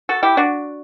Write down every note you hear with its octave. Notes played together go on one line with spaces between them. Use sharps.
F#4 A4
E4 G4
D4 F#4